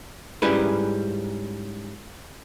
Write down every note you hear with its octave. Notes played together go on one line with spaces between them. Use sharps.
G#2 G3 C#4 E4 G#4 B4